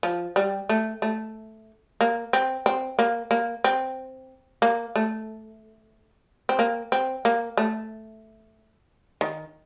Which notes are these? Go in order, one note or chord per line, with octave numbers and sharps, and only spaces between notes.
F3
G3
A3
A3
A#3
C4
C4
A#3
A#3
C4
A#3
A3
C4
A#3
C4
A#3
A3
D#3